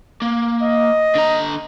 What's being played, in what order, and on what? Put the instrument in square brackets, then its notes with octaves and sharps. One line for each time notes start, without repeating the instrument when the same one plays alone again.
[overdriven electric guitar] A#3
[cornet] D#5
[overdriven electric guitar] D3 A#5